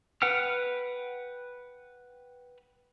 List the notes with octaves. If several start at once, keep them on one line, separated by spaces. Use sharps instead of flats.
B4 F#5 G5 F6